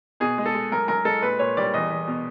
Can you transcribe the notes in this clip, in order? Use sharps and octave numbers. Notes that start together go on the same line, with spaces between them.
B2 G#4
G#3
A4
G#3
F#2 A#4
F#2 A#4
G#3 A4
A#2 B4
A#2 C#5
G3 D5
E2 D#5
E2
B2